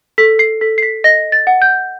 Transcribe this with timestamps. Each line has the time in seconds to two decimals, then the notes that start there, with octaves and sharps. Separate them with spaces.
0.18 A4 B6
0.39 C7
0.61 A4 B6
0.78 C7
0.83 B6
1.04 D#5 A#6
1.32 A6
1.47 F#5
1.62 G6